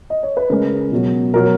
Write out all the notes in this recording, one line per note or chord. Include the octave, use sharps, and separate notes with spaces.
D#5
C#5
B4
C#3 G#3 A#4
B2 F#3
B2 F#3 A#4